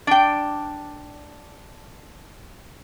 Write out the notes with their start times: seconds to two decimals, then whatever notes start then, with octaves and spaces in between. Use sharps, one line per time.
0.07 D4 G5